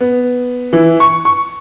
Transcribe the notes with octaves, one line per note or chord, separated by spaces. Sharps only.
B3
E3
C#6
C#6